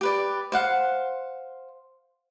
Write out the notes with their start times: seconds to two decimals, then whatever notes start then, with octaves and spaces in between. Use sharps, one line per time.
0.01 G4 B4 D5
0.52 C5 F5 F#5